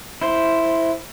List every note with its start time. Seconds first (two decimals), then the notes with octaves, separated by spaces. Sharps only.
0.22 E4 C5